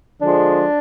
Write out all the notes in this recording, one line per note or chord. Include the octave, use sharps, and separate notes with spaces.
D3 F3 G#3 D4